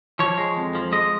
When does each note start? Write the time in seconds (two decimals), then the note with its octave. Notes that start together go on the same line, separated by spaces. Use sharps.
0.19 F3 C#5
0.38 G#3
0.57 F2
0.75 F3
0.92 G#3 D#5